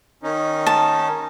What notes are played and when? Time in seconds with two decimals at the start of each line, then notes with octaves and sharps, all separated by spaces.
0.23 D#3 C#4 D#4
0.67 A5